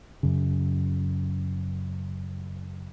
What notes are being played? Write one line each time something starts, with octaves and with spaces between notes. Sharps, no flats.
F#2 C#3